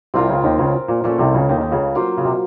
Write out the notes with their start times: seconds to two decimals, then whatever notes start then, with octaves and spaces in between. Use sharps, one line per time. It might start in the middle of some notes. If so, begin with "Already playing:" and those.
0.14 C2 C3 C4 F4 A#4
0.28 C#2 C#3
0.44 D#2 D#3
0.58 C#2 C#3
0.88 A#2
1.04 A#2 A3 C#4 A4
1.19 C2 C3
1.34 C#2 C#3
1.49 D#2 D#3
1.61 D#3
1.72 C#2 C#3
1.95 F#3 A#3 F4 C5
2.18 C#3
2.25 C3